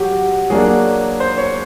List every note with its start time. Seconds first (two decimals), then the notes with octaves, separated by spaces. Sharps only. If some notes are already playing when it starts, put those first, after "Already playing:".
Already playing: F#3 F#4 G4
0.50 F#3 A#3 D4 G#4
1.20 C5
1.38 C#5